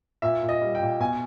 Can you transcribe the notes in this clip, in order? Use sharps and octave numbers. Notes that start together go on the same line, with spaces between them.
A#2 E5
A#2
D#5
G3
G5
A#2
B2 G#5